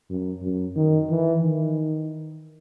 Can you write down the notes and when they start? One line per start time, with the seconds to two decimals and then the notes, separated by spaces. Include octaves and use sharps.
0.10 F#2
0.43 F#2
0.76 D#3
1.10 E3
1.42 D#3